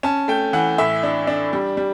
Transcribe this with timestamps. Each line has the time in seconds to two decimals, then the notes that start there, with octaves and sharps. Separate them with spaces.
0.03 C#4 A5
0.28 A3 G5
0.53 E3 F#5
0.78 A2 E5
1.03 D4
1.27 D4
1.53 G3
1.77 G3